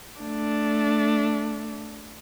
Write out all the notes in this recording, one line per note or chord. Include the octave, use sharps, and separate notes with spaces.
A3 D4